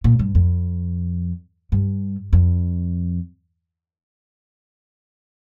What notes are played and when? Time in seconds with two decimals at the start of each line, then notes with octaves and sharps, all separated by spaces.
0.04 A#2
0.19 G2
0.35 F2
1.72 G2
2.33 F2